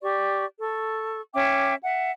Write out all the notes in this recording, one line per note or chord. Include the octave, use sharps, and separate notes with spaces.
G4 D5 C#6
A4 C#6
C#4 E5 G5 D6
E5 F#5